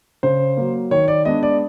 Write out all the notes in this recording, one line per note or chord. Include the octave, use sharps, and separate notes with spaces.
C#3 C5
F#3 A#3
D#3 C#5
D5
G#3 B3 D4 D#5
D5